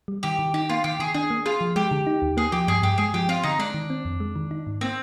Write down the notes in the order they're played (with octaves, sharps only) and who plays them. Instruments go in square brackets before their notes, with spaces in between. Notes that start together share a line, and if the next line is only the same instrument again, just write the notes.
[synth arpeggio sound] G3
[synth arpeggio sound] D#3 [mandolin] G4
[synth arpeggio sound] D#3
[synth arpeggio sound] D#4 [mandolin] G4
[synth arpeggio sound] A#3 [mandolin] F4
[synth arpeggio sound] D#3 [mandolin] G4
[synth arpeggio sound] D#3 [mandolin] G#4
[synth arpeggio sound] D4 [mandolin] G#4
[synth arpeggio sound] A#3
[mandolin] F4 [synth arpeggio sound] G#4
[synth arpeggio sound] F3
[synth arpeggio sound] G#3 [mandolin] G4
[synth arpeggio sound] D3
D#4
D#2
[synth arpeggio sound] A#3 [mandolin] G#4
[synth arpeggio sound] F3 [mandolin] G4
[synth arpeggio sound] G2 [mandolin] G#4
[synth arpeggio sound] G2 [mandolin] G4
[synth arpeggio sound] G#3 [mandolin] G#4
[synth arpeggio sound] F3 [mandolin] G4
[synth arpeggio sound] C4 [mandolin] F4
[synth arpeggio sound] D3 [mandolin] D#4
[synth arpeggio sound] G#3 [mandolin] D4
[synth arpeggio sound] D#3
C4
F2
G#3
D#3
D#4
G#2
[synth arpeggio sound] A#3 [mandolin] C4